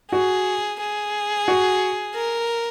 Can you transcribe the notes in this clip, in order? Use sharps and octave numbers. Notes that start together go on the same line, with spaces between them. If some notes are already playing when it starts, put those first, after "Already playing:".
F#4 G#4
G#4
F#4
A#4